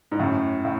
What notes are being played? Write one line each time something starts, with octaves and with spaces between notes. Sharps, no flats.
G#2
F#2 A2
A2